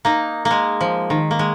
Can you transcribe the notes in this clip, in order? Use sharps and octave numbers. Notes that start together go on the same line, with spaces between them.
A#3 D#4
A#3
G#3
F3
D#3
A#3
G#3